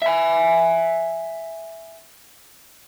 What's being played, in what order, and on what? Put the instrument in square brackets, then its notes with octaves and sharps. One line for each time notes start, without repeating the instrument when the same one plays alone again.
[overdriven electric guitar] E5 G#5